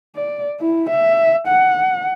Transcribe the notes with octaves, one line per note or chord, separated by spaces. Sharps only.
D5
E4
E5
F#5